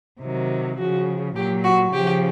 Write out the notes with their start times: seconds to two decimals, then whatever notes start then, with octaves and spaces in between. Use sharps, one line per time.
0.21 C3 D#3 F#3
0.78 C#3 F3 F#4
1.36 A#2 F#3 G4
1.64 F#4
1.93 C#3 F3 G4